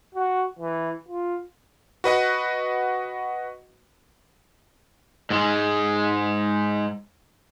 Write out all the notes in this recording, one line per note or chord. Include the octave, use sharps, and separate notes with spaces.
F#4
E3
F4
F#4 B4 D#5 F#5
G#2 G#3